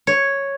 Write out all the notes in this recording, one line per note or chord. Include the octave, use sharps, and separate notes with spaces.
C#5